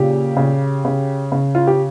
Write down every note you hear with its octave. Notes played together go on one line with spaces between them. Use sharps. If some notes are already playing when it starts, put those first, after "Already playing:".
Already playing: A#2 C#3 G4
C#3
C#3
C#3
F4
G4